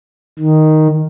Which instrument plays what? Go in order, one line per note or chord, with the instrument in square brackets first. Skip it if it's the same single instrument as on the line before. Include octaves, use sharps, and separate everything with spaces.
[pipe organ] D#3